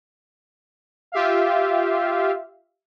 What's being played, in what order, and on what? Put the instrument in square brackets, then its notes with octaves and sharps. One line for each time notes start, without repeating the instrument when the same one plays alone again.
[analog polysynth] F4 G4 E5 F5